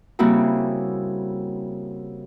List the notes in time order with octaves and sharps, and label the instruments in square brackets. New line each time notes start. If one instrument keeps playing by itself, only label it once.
[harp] C#3 G3 A#3 C4 E4 F#4